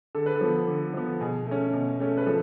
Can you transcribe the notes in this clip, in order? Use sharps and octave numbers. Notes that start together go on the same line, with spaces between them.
D3 A4
B4
A4
F3 B3
D3
F3 B3
B2 G#4
A3 C#4
B2
A3 C#4
B4
F3 A4